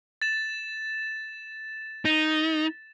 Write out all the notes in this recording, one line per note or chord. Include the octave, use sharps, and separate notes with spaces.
A6 E7
D#4